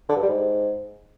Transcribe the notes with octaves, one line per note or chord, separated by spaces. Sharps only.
D3
G2
G3
G#2